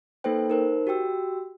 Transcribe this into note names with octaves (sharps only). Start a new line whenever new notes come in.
A#3 D#4 A4 B4 C5 G5
D#4 A#4 C5
F#4 G4 G5 E6